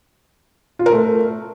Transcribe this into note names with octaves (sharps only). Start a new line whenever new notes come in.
F4
A#4
A3